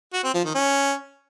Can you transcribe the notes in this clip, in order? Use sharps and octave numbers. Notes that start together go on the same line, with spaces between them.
F#4
C4
F3
D#3
C#4